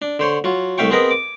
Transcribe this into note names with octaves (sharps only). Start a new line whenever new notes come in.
D4
D3 C5 C#5 C6
F#3 F4
C2 A3 E5 F5 G5 C#6
B3 C4 G#4 A#4 B4 D#5
D6